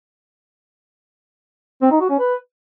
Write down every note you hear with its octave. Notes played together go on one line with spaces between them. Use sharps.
C4
D#4
F#4
C#4
B4